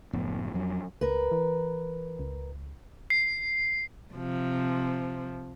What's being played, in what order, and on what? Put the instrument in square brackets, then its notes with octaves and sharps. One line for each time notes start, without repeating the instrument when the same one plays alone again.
[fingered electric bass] F#1 A2 F3 B3
F2 F#3
[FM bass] C#2 [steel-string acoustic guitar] A#4 B4
[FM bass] E3
C#2
[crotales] C7
[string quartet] C3 F3